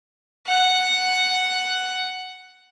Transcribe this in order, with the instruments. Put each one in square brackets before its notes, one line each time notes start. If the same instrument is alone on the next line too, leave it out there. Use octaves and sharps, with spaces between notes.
[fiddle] F#5 F#6